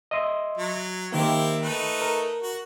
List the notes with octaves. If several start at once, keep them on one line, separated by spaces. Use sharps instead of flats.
D#5 E5 C6
F#3
D#3 A#3 C4 E4 G4
A3 D#4 B4
A#4
F#4